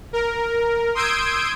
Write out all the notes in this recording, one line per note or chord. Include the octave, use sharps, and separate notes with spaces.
A#4
C6 D#6 E6 G6 G#6 D7